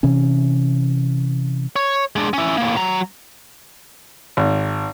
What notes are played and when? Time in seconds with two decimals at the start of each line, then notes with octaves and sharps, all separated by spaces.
0.03 C3 E3 C#4
1.76 C#5
2.16 G#3 D4
2.33 C#4 E4
2.57 A2 A#3
2.77 F#3 A#5
4.37 G#1